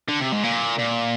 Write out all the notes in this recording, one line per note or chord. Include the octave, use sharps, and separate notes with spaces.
D3
C3
G#2
A#2
A#2